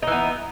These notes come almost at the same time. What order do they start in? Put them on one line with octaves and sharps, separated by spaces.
D#4 E3 B3